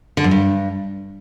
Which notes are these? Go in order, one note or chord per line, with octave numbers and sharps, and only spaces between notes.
D3
F#2
G2